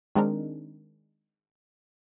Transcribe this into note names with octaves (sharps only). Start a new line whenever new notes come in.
D#3 G#3 C4 D4 D#4 A#4